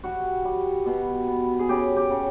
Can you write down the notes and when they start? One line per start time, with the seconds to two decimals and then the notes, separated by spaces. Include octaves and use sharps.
0.04 G3 F#4
0.45 G3
0.86 B2
1.28 B3
1.59 G#4
1.69 C#3 G4
1.97 G4
2.11 C#3